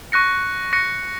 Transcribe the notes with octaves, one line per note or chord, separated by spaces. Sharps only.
C#6 F#6 A#6 C#7
C#6 F#6 A#6 C#7